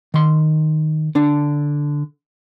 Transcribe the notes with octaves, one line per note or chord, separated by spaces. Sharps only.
D#3 C6
D3 D4